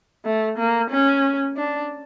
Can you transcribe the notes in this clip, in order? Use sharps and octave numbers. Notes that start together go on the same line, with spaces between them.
A3
A#3
C#4
D4